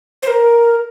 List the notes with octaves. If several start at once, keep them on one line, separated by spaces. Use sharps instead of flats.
C5
A#4